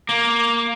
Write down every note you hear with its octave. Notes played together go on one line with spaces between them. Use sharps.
A#3